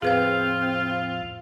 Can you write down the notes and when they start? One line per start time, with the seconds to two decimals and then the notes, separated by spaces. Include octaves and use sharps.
0.02 E2 A2 F3 C4 F4 G#4 B4 F5